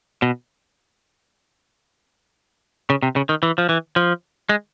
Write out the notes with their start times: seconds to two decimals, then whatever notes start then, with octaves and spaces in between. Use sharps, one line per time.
0.22 B2
2.90 C#3
3.03 C3
3.16 C#3
3.29 D#3
3.43 E3
3.58 F3
3.69 E3
3.96 F3
4.49 G#3